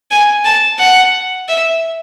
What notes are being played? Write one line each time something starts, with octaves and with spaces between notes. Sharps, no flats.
G#5
A5
F#5
E5